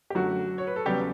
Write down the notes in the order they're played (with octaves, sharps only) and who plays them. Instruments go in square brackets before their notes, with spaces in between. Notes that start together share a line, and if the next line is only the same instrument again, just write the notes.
[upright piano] G4
F#2 D3 F#3 A3 F#4
C#5
B4
A4
E2 C#3 F#3 G3 B3 G4